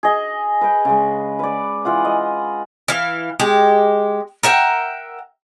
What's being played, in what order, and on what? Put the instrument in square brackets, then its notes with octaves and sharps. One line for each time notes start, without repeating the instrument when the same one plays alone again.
[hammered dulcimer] G#4 D#5
B4 G5
C#3 G#3
B4 D5
E3 F4 F#5
D#5
[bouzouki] E3 F5
G#3 G4
A#4 E5 F#5 G5